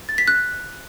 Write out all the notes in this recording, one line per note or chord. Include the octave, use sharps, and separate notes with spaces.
A6
B6
F#6